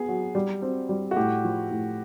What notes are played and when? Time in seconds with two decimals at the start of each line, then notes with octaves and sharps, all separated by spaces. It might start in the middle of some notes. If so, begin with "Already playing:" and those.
Already playing: B3 G#4
0.08 F#3
0.35 G3
0.62 C4
0.89 G3
1.11 F#4
1.16 A2 G4
1.44 F3
1.71 A2